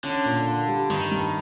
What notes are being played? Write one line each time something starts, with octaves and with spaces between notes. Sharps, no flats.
D3 C#4
A#2
F4
G3
G2 D#3
G2